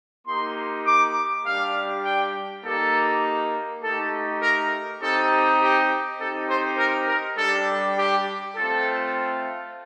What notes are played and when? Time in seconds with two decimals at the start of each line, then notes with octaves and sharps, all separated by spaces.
0.28 A#3 D#4 G4 C6
0.87 D6
1.45 G3 D4 G4 F5
2.04 G5
2.65 A#3 D#4 G4 A4
3.83 A3 D#4 G4 A4
4.42 A#4
5.01 C4 D#4 G4 A4
5.61 G4
6.20 C4 D#4 G4 A4
6.50 C5
6.78 A#4
7.08 A#4
7.37 G3 D4 G4 A4
7.98 G4
8.56 A3 C4 F4 A4